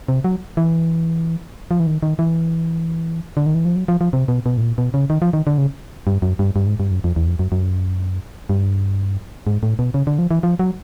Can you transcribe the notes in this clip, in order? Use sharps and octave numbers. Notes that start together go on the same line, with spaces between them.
C3
F#3
E3
F3
E3
D#3
D#3
E3
D3
D#3
E3
F3
F#3
F3
F3
C3
B2
B2
A2
A#2
B2
C#3
D#3
F3
D#3
D3
C#3
G2
F#2
G2
G2
G#2
G2
F#2
F2
E2
F2
F#2
F#2
G2
G#2
A2
B2
C#3
D3
F3
E3
F3
F#3